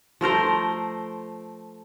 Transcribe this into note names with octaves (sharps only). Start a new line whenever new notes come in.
F3 A3 A#4 C5